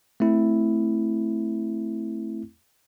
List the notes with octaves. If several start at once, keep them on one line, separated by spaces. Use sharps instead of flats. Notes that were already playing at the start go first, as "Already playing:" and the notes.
A3 C4 E4